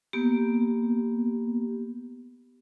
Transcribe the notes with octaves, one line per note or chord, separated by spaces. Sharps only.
A#3 B3 G4